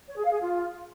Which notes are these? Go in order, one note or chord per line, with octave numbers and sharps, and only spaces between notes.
C#5
G#4
F5
G#4
F4